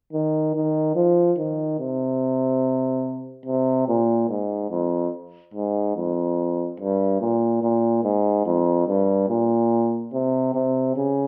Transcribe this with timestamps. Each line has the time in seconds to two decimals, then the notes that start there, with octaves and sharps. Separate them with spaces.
0.13 D#3
0.55 D#3
0.95 F3
1.38 D#3
1.80 C3
3.46 C3
3.88 A#2
4.29 G#2
4.71 F2
5.54 G#2
5.96 F2
6.80 G2
7.21 A#2
7.62 A#2
8.04 G#2
8.46 F2
8.87 G2
9.29 A#2
10.13 C3
10.54 C3
10.96 C#3